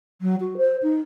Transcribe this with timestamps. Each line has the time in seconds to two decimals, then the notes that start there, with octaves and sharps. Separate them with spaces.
0.21 F#3
0.40 F#4
0.57 C5
0.82 D#4